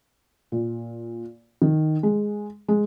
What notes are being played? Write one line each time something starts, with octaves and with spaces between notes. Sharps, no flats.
A#2
D#3
G#3
G#3